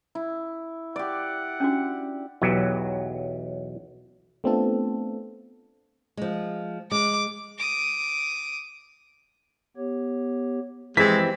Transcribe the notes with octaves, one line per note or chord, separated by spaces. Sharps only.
E4
G4 D5 F#5
C#4 D4 F#4
B1 E2 F#3 B3 F#4 G4
A3 B3 C4 D4 F4 A4
F3 G#3
G#3 D6
D6 D#6
B3 G4 C#5
E3 F3 G#3 C4 G4 B6